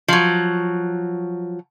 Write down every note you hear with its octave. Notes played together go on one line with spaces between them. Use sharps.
F3 F#3